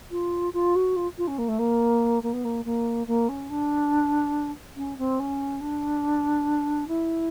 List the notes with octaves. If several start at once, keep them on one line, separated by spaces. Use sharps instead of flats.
F4
F4
F#4
F4
F4
C#4
A#3
A3
A#3
A#3
B3
A#3
A#3
A#3
C#4
D4
C#4
C4
C#4
D4
E4